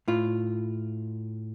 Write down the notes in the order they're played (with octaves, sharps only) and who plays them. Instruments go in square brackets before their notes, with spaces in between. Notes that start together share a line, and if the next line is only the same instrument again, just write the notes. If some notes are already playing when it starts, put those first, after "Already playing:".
[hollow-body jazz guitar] A2 F4